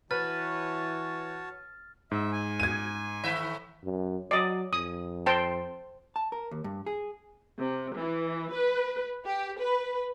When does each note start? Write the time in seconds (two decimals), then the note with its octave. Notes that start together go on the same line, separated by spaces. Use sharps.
0.11 E3 F#4 B4 C#5 A5 F6 A6
2.11 G#2 E5
2.32 G#5
2.60 G#6 D#7
3.23 A2 D#3 E5
3.84 F#2
4.31 F#3 D5 D#5
4.73 F2 D#6
5.26 C5 G5 A5
6.16 A5
6.32 A#4
6.51 D#2
6.64 G2
6.86 G#4
7.58 C3
7.97 E3
8.52 B4
9.27 G4
9.61 B4